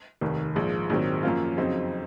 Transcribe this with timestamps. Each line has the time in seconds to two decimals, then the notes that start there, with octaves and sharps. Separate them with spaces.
0.21 F1 D#2 D#3
0.55 A#1 G#2 F3 G#3
0.90 A#1 G#2 D#3 F#3 C4
1.23 F#2 F3 A#3 C#4 F4
1.57 F2 C#3 F#3 C4 D#4